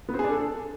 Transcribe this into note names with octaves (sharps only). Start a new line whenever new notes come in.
B3
C4
G#4
D4
A4